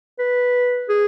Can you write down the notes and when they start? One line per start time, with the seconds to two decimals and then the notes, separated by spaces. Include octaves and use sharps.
0.19 B4
0.89 G#4